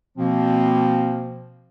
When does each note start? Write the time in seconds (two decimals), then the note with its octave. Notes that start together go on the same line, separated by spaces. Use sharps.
0.17 B2 F3 A#3 C4